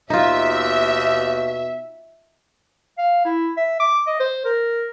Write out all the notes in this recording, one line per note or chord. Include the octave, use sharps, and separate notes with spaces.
D#2 B2 D#4 F4 E5
F5
E4
E5
D6
D#5
C5
A#4